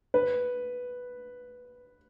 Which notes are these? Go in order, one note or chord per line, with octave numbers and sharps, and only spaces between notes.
B4